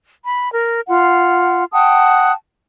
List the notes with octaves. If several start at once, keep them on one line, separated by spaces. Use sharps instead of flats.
B5
A#4
F4 F#5
F#5 G5 A5 D#6